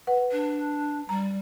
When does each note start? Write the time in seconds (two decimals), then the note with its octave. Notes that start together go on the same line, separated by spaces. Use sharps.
0.07 B4 F#5
0.32 D4
1.09 G3 A#5